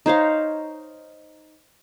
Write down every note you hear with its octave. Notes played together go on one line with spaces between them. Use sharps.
D#4 C5 C#5 F5